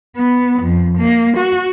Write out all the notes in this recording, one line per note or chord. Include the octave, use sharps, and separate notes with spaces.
B3
F2
A#3
F#4